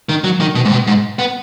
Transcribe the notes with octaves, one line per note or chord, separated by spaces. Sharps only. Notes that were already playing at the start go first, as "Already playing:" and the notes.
D#3
F#3
D#3
B2
G#2
B2
G#2
B3